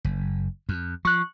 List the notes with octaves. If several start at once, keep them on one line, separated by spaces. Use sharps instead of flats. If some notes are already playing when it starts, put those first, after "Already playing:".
F#1
F2
F3 C#6 F#6